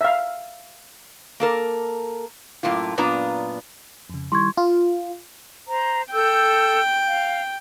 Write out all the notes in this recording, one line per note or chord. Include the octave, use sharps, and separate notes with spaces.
E5 F5
A#3 A4 A#4
F#2 A2 A#3 F4
F#2 A#2 B3 D4 F4 A#5
F2 C#3
D#3 G3 E4 C6 C#6 G#6
F4
C5 A#5
A4 G5 E6 G6
F5